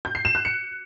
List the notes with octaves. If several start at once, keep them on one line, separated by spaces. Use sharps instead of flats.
G6
C7
E7
F#6
C#7